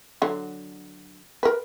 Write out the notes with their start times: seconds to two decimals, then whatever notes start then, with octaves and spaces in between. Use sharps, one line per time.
0.22 D3 F#3
1.43 A#4 B4